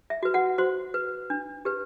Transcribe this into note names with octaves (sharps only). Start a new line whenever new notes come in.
E5
F#4 B4
F#4 F#5
F#4 C5 C6
B4
D4
G4 B4